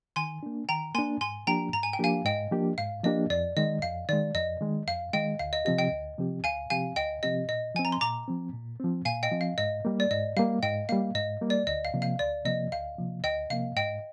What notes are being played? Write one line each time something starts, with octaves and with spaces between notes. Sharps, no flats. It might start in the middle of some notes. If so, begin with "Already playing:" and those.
D#3 G#5 C6
A#3 D4
D#3 G5 A#5
A#3 D4 G#5 C6
G#2 G#5 C6
F3 A#3 D4 G4 G5 A#5
G#2 A#5
G#5
G5
F3 A#3 D4 G4 F5 G#5
G#2 D#5 G5
F3 A#3 D4 G4
G#2 F5
F3 A#3 D4 G4 D#5
F2 D5
D#3 G#3 D#5
F2 F5
D#3 G#3 D5
F2 D#5
D#3 G#3
F2 F5
D#3 G#3 D#5 G5
D2 F5
D#5
C3 F3 C4 G4 D#5
D#5 G5
D2
C3 F3 C4 G4
D2 F5 G#5
C3 F3 C4 G4 F5 G#5
D2 D#5 G5
C3 F3 C4 G4 D#5
A#2 D#5
F3 C4 G#5
A#5
C6
A#2 A#5 D6
F3 C4
A#2
F3 C4
A#2 F5 G#5
D#5 G5
F3 C4
F5
G#2 D#5
G3 A#3
D5
G#2 D#5
G3 A#3 F5
G#2 D#5 G5
G3 A#3 F5
G#2 D#5
G3 A#3
D5
D2 D#5
F5
C3 F3 A#3
F5
D2 D5
C3 F3 A#3 D#5
D2 F5
C3 F3 A#3
D2 D#5 G5
C3 F3 A#3 F5
G#2 D#5 G5